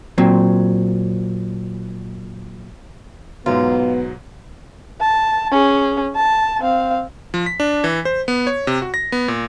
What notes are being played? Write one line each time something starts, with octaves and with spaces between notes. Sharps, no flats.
A#2 F#3 C4
G#2 B2 F#3 B3 F4
A5
C#4 G#4
A5
C4 F5
F3
B6
D4
E3
C5
B3
C#5
C3
F#4
A#6
B3
A#2